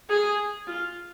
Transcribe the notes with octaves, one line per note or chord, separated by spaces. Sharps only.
G#4
F4